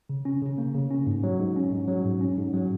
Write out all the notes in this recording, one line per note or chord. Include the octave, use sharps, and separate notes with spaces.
C#3
C#4
C#3
A#3
C#3
C#4
G#2
F#3
G#2
C#4
G#2
F#3
G#2
C#4
G#2
F#3